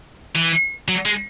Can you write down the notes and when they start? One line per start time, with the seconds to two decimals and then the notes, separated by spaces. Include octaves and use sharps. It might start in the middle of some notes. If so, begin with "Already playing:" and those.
0.35 E3
0.88 F#3
1.05 G#3